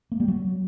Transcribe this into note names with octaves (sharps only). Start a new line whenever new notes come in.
A#3
G3
F#3